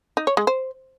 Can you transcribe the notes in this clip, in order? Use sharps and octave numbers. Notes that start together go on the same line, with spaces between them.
D#4
C#5
G#3
C5